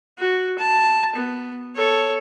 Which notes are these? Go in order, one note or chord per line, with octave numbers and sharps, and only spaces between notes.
F#4
A5
B3
A4 C#5